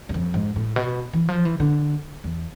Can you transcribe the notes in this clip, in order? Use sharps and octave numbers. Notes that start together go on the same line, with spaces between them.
E2
F2
G#2
A2
B2
E3
F3
E3
D3
E2